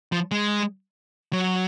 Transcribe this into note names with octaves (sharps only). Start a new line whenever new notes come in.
F3
G#3
F#3